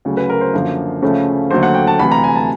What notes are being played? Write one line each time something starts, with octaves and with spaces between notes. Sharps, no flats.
D2 C#3 F#3
B4
A#4
C5
F#2 D3 F3 A#3
D2 C#3 F3 A3 C#4
D#2 D3 F#3 A3 C5
F#5
G5
A5
D2 C3 E3 B5
A#5
G#5
A5